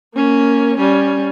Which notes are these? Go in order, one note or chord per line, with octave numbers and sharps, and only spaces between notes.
A#3 C#4
G3 C#4